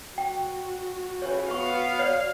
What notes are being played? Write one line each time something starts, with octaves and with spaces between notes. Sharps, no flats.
F#4 G5
F2 C#3 E3 G4 C#5
B3 F5 C#6
C#5 D5